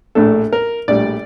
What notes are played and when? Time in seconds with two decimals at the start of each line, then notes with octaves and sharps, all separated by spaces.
0.15 A#1 A2 A3 D4 A4
0.53 A#4
0.88 A#1 A2 G3 D5